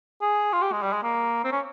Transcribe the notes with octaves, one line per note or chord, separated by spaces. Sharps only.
G#4
F4
G4
G#3
G3
G#3
A#3
C4
C#4